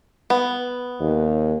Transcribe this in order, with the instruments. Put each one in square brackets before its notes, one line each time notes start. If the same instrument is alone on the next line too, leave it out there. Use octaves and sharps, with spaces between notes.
[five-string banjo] B3
[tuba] D#2